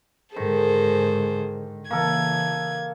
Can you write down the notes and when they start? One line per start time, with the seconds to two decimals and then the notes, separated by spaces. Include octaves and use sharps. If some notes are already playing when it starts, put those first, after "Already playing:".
0.36 G#2 D3 D#3 G#4 A4 C5
1.91 C#3 E3 A#3 A4 G#6